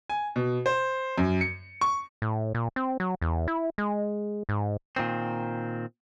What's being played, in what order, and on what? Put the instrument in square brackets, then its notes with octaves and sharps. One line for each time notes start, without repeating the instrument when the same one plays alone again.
[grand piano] G#5
B2
C5
F#2
C#7
C#6
[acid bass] A2
A#2
C4
F#3
E2
E4
G#3
G#2
[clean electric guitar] A#2 D#3 C4